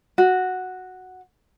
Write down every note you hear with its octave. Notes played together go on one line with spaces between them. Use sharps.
F#4